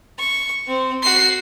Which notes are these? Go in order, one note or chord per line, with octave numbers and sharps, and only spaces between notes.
C#6
C4
F#4 C7